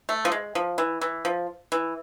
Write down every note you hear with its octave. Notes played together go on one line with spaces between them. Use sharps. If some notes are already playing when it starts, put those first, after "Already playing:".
A3
F3
G#3
F3
E3
E3
F3
E3